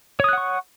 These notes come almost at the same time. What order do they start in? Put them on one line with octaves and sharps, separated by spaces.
C#5 D#6 F#6 F#5 C#6